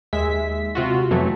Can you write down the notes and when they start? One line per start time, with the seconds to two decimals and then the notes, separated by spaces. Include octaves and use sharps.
0.13 D#2 G#3 E5 B6
0.75 C3 F4 F#4
1.11 F2 E3 F#3 A3